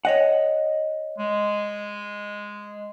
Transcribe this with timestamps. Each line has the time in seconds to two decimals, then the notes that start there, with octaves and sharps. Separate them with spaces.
0.05 C#5 D#5 F#5
1.18 G#3